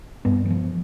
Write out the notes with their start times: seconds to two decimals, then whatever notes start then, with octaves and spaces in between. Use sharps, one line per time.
0.25 G2 B3
0.46 F#3
0.50 F3